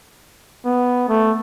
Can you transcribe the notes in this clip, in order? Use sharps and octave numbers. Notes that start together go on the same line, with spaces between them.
B3
A3